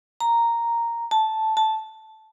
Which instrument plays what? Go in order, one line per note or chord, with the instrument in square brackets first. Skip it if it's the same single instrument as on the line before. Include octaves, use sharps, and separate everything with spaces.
[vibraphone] A#5
A5
A5